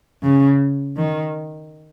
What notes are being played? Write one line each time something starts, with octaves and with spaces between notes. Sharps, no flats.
C#3
D#3